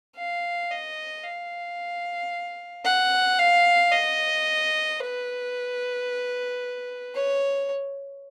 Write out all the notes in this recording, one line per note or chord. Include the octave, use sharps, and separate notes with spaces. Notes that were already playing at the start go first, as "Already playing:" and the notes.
F5
D#5
F5
F#5
F5
D#5
B4
C#5